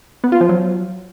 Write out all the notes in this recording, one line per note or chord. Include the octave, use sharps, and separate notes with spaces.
B3
F4
F3
F#3